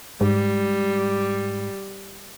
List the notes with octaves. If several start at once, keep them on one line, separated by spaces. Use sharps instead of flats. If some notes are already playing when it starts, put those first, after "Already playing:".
G#2 G3